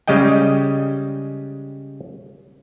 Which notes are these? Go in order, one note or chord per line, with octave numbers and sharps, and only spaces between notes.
C#3 G3 G#3 D#5 G5